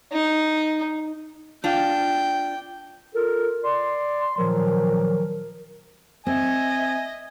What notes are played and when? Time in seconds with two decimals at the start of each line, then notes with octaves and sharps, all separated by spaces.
0.12 D#4
1.64 D4 F4 G5
3.14 F4 A4 A#4
3.64 D5 C6
4.37 A#2 D#3 F3 F#3 A#4
6.27 C4 D#5 E5 G#5